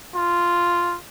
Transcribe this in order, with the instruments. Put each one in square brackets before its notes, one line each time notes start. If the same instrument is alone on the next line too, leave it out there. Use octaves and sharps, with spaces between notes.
[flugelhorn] F4